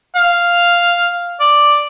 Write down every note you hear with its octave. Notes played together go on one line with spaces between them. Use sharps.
F5
D5